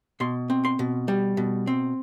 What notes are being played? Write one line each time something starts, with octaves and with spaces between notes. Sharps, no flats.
B2 C6
C4
C6
B2
G3
B2
C4